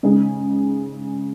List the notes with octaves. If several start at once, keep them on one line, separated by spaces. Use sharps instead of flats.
C#3 G#3 D#4 G#4